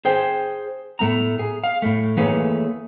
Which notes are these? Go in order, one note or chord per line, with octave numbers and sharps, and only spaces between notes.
G#4 C5 G5
A2 A3 B3 A#5
G#4
F5
A2 A3
E3 A3 A#3 G#4 B4 C#5